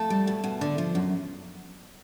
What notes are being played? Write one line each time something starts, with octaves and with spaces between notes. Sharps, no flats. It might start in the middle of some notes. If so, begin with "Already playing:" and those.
Already playing: F2 A3 A4
G3
B2
B2
D3
F3
F#2